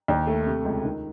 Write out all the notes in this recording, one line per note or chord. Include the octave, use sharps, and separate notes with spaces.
D#2
A3
C3
C#2
D#3